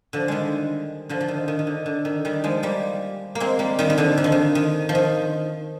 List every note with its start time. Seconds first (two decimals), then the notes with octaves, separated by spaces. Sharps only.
0.13 D3 F3
0.28 D#3 G3 G#3
1.09 D3 F3
1.20 F3
1.28 D#3
1.48 D#3
1.59 D#3
1.67 D3
1.86 D3
2.05 D#3
2.25 D#3 G3
2.44 F3 G#3
2.63 G3 A#3
3.35 A#3
3.40 G#3 C4
3.59 G3 A#3
3.79 D#3 G3
3.90 D#3
3.98 D3 F3
4.17 D#3
4.24 F3
4.32 D#3
4.55 D#3
4.89 F3
4.95 D#3